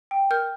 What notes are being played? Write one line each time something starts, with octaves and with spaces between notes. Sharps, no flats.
G5
A#4 F6 G6